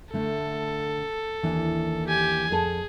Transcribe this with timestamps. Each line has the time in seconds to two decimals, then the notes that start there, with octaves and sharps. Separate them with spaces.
0.13 D3 A3 A4
1.43 D#2 E3 D4
2.08 G4 G#5
2.51 F2 G#4 A4 A5